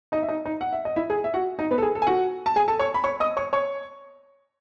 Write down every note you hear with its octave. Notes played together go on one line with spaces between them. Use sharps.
D#4 D#5
E5
D#4 D#5
D#4 D#5
F#5
E5
D#5
E4 E5
G#4 G#5
E5
F#4 F#5
D#4 D#5
B3 B4
A4
G#4
A4
G#5
F#4 F#5
A5
G#4 G#5
A4 A5
C#5 C#6
B5
C#5 C#6
D#5 D#6
C#5 C#6
C#5 C#6